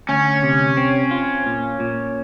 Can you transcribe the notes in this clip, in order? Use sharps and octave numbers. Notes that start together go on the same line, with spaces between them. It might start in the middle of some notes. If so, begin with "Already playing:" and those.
D2 C#4
C3
C4
F4
A#2
A#2